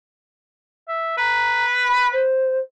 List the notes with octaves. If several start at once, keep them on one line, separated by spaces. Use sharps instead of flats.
E5
B4 A#5
B5
C5